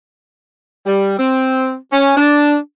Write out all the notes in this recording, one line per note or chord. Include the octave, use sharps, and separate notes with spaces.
G3
C4
C#4
D4